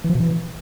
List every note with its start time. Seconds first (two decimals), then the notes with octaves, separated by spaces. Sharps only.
0.04 E3
0.10 F3
0.15 B2
0.20 E3